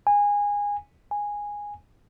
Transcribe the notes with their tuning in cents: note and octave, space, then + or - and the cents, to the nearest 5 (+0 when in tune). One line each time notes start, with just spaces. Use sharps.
G#5 -20
G#5 -10